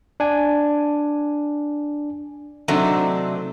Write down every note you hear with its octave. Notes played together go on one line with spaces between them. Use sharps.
D4 G#5
C3 F#3 A3 C4 D4 D#4